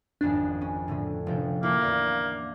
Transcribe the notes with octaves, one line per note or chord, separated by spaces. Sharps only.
G#1 F2 C#4 D4
C#4
A2 D3 C#4
F1 F3 G5
A#3 E4 F4 A5
E2 D5 F5